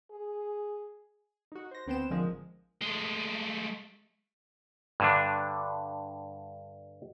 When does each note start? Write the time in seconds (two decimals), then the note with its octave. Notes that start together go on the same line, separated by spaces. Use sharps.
0.11 G#4
1.52 D#4 F#4
1.71 C5 A#6
1.87 D2 B3 C4 C5 G5 E7
2.10 A1 D3 F3 G#3 A#4
2.82 G#3 A3
5.00 G2 D3 D4